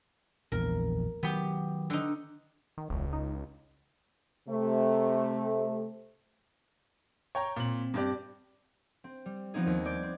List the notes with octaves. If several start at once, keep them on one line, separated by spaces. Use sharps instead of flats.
A#1 E2 A#4
D#3 F#3 B3 G4
D3 D#4
D#3
E1 C#2
D#4
C3 A3
C#5 G5 A#5
A#2 C4 F#7
G2 G4 D5
C4
G3
F3 B3 C4 D#4 G#4
D#2
D5 D6 G6 G#6
C4